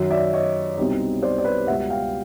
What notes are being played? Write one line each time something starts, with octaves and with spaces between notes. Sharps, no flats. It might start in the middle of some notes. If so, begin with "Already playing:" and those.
Already playing: F#2 D#3 F#3
D5 E5
C#5 D#5
C2 B2 G3 C4 D#4
C5 D5
D5
B4 C#5
C#2 B2 G3 E5 F#5
F5 G5